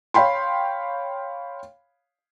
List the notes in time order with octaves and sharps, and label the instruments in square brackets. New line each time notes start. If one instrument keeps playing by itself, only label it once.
[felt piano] C#5 F5 G5 B5 C6